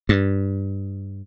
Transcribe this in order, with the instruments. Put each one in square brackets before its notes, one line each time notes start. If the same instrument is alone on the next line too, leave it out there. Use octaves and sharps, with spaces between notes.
[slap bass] G2